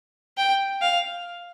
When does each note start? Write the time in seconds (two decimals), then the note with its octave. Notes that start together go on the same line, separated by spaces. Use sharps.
0.37 G5
0.82 F5